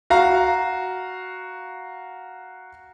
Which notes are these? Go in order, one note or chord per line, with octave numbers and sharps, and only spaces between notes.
F#4 F5 A#5